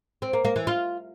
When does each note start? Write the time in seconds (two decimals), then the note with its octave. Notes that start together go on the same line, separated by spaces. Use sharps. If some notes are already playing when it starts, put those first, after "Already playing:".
0.22 C4
0.33 A#3
0.45 A#3
0.56 E3
0.67 F4